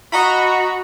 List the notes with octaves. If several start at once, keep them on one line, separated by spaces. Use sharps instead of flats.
F#4 D#5 A#5 B5 C#6